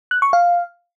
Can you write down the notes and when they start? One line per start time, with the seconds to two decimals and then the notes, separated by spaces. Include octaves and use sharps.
0.11 F#6
0.22 C#6
0.33 F5